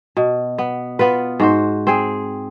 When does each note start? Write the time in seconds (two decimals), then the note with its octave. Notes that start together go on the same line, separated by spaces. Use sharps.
0.17 B2
0.58 B3
0.99 B3 F4 B4
1.40 G#2 F#4 C5
1.87 C4 G#4